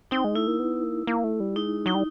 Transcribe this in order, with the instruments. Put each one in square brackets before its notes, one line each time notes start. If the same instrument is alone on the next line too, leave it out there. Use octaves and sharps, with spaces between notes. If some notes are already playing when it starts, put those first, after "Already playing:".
[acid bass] C4 [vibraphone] D#4
[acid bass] G#3
[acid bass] A3 [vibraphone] E4
[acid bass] A#3
B3
A#3
A#3
A3
G3
[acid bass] G#3 [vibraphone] D#4
[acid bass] F#3 [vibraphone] D#4
[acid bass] G3